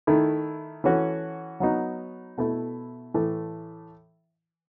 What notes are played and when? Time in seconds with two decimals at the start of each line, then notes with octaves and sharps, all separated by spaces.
0.07 D#3 A3 E4
0.84 E3 A3 C#4 F#4
1.60 F#3 B3 D#4 F#4
2.38 B2 A3 E4
3.14 A2 E3 A3